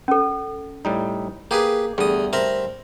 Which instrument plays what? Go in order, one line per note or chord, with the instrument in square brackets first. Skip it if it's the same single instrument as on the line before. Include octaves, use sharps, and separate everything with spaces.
[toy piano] C#4 A4
[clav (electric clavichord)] A2 G3 D#4
[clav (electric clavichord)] A#3 [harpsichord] G4 G#4 B4
[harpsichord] E2 D#6 [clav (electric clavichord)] D3 G3 A3
[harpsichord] C4 A#4 E5